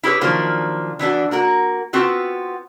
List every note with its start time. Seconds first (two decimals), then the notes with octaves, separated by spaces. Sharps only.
0.03 E4 G4 G#4 B4 C#5
0.21 D#3 F3 F#3 A#3 D4
0.99 E3 B3 D4 F#4
1.31 A#3 F#4 A#4
1.93 B3 C4 F4 F#4 B4